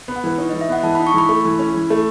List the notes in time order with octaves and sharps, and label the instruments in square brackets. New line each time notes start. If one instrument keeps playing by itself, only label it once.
[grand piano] B3
[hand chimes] F#5
[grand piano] E3 [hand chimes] B4
[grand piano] D#4 [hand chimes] C#5
[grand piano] E3 [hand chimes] D#5
[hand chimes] E5
[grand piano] B3 [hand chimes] F#5
[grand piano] E3 [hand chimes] A5
[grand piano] D#4 [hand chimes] B5
[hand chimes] C#6
[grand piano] E3 [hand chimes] B5
[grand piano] A3
E3
C#4
E3
A3